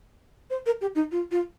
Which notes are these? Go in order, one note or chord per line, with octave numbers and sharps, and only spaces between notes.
C5
A#4
G4
D#4
F4
F4